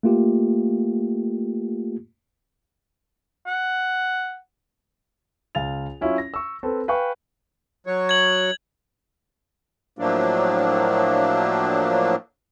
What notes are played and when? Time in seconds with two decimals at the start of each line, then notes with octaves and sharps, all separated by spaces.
0.03 A3 A#3 F4 G4
3.47 F#5
5.55 C#2 F5 G#5 A6 F7
6.01 F#3 C#4 E4 F4
6.18 A#6
6.34 C#6 E6
6.63 C4 A4 B4
6.88 B4 F5 G5 G#5 C#6
7.87 F#3 C#5
8.09 G#6 F#7
9.99 A2 F3 F#3 A3 A#3 D4